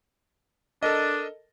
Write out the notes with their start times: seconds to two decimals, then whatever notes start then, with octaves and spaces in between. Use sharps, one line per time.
0.83 D4 A4 A#4 D#5